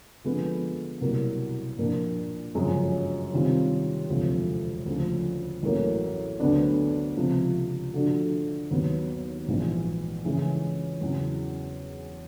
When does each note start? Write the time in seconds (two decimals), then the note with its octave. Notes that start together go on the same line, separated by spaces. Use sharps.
0.24 D3 F3 G#3 B3
1.01 C2 B2 F#3 A#3
1.78 A#2 F3 A#3 D4
2.55 G1 F#2 C#3 F3 G#3
3.32 C3 D#3 G3 C4 F4
4.09 E1 D2 C3 F3 A3
4.86 D2 C#3 F3
5.63 A1 A2 F#3 A#3 C#4
6.40 D2 D3 F#3 B3 D4
7.17 C#2 C3 F3
7.94 D3 F3 A3 D4 F#4
8.71 D#2 D#3 F#3 B3
9.48 A#1 G#2 E3
10.25 C#3 E3 G#3
11.01 E2 C#3 F#3